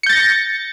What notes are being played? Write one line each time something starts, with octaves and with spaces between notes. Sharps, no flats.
G6 A6 A#6 C#7